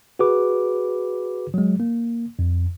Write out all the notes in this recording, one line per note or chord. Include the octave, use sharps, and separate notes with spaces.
F#4 G#4 B4 D6
F#3 G#3
A#3
F2